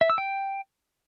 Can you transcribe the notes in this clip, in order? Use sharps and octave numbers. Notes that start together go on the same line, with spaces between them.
E5
E6
G5